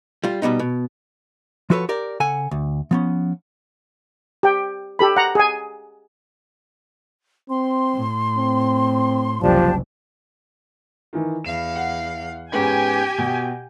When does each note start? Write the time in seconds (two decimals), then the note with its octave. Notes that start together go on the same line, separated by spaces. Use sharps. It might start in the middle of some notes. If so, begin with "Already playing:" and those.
0.24 G3 F4
0.42 B2 G3 B3 D#4
0.59 B2
1.70 F3 F4 F#4 A4 B4 C#5
1.89 G4 A#4 D5
2.20 C#3 A4 F#5 G#5
2.51 D2
2.91 F3 B3 C#4
4.43 G4 G5
4.99 G4 A4 B5
5.16 F#5 A#5
5.35 G#4 G#5
7.50 C4 C6
7.95 A2
8.38 C4
9.41 F#1 C2 F3 D4 G4 A5
11.13 D#3 E3
11.44 E2 F5 E7
11.76 F#5
12.52 G#2 B3 C#4 G4 G5 G#5
13.18 B2